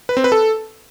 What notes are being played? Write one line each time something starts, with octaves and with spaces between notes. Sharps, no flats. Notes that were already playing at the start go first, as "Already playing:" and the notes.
B4
C4
B4
A4